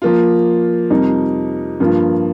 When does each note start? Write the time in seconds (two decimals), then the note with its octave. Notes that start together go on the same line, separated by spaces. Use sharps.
0.02 F3 A#3 F4
0.90 F2 C3 G3 D#4 A#4
1.80 G2 F3 A#3 F4